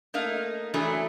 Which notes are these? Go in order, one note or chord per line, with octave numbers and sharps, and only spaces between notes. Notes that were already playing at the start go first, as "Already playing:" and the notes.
A3 A#3 D#4 F5
E3 F#3 A3 D4 G#4